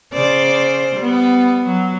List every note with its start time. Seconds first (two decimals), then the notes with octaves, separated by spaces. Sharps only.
0.13 C#3 C5 D5
0.96 G3 B3
1.65 F#3